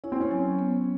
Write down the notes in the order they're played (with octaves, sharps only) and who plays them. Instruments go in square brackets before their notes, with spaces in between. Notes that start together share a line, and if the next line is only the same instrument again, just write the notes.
[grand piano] C#4 [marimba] E4
[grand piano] C4
C#4
[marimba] F#3
B3